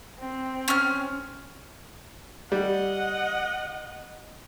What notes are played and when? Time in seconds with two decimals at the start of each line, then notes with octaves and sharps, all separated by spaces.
0.19 C4
0.68 C#4 F6
2.52 G3 D#5 F#5